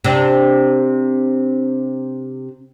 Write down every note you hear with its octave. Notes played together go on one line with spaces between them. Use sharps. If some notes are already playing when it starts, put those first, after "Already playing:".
C3 D4